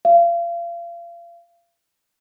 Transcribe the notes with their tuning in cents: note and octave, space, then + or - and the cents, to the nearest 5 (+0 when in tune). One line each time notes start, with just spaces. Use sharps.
F5 -35